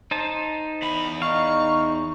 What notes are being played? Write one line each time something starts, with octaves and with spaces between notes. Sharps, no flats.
D#4 C5 A5
E2 B5
D#4 F5 C#6